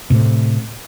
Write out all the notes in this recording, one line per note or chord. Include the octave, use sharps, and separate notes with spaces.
A2 C3